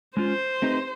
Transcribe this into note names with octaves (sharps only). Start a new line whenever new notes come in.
G#3 C#4 F4 C5
A3 C4 D#4 G4 B4